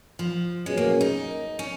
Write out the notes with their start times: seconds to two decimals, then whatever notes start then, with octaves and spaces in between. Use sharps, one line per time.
0.19 F3
0.66 B2 F#3 G#3 C#4 G#4
0.77 A#3
1.01 D#4
1.59 C#4